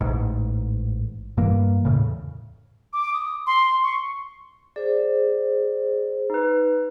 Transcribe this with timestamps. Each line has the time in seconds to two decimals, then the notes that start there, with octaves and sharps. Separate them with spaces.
0.01 A1 G#2
1.37 G2 E3 A#3
1.85 E2 A2 C#3
2.93 D6
3.13 D#6
3.47 C6
3.83 C#6
4.76 G#4 C5 D5
6.30 D#4 B4